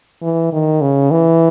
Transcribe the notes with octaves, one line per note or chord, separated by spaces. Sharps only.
E3
D#3
C#3
E3